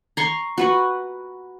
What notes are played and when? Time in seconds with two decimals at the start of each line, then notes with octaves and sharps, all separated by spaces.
0.17 A#5 C6 C#6
0.58 F#4 B4 C#6